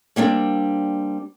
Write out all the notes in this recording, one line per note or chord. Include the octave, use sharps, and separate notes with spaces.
G3 A#3 C4 D4